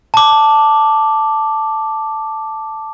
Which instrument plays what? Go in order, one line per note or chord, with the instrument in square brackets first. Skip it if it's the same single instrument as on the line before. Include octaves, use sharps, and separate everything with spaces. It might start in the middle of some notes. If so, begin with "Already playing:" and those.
[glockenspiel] A5 D6